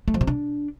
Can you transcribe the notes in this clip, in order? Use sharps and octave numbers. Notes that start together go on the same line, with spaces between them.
A3
F3
C3
D4